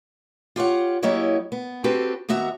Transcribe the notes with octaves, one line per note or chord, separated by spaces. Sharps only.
F4 G4 C#5 F#5
F#3 A#3 E4 G4 C#5 D#5
B3
C4 F#4 G4 A4 B4 C5
D#2 B3 F#4 E5 F#5 A#5